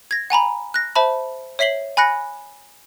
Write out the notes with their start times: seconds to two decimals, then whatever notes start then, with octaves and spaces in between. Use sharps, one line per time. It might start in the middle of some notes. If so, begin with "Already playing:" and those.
0.11 G#6 A#6
0.30 F#5 G#5 A#5 B5
0.74 F#6 A#6
0.96 C5 E5 A5 B5
1.59 C#5 E5 B6 C7 F#7 G7
1.97 G#5 B5 F#6 A#6 C#7